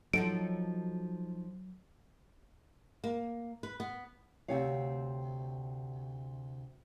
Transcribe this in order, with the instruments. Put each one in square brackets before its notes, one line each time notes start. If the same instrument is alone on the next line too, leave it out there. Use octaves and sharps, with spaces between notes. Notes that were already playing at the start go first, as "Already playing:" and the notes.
[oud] F3 D#4 A4 [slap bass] F#3 [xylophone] D7
[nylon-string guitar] A#3
B4
B3
D2 C3 C4 G4 C#5 F5